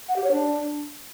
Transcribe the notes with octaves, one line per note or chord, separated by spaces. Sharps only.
F#5
G4
C#5
D4